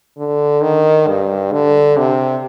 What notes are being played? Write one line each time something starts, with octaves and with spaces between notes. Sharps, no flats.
D3
D#3
G2
D3
C3